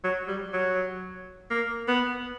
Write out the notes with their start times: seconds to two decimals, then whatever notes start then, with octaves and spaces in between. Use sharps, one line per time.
0.04 F#3
0.28 G3
0.53 F#3
1.51 A#3
1.88 B3